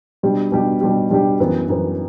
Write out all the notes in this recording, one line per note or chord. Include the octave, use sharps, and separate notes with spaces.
B2 G3 D4 G4
B2 G3 D4 G4
B2 G3 D4 G4
B2 G3 D4 G4
F#2 E3 B3
F#2 E3 B3